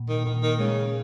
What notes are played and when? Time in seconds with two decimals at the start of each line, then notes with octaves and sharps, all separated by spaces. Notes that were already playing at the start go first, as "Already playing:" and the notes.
Already playing: A#2
0.09 D#3
0.25 A#2 D#3
0.42 D#3
0.59 C#3 G#3